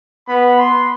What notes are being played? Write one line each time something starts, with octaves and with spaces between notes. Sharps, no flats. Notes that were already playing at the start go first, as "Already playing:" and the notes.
B3 B5
C6